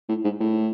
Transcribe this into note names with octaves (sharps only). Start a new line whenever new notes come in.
A2
G#2
A2